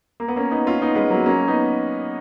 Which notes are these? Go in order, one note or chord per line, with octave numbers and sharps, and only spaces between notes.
A#3
B3
A#3 C#4
B3 D#4
C#4 F4
B3 D#4
G#3 B3
F#3 A#3
A#3 C#4
B3 D#4